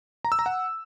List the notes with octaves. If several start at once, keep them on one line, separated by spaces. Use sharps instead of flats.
A#5
E6
A#5
F#5